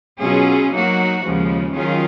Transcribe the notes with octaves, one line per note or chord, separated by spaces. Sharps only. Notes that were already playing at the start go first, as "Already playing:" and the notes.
B2 F#3 C#4 F4 G#4
F#3 A#3 D#4 F#4
D#2 C#3 F3 G#3
D#3 F#3 C#4 F4 G#4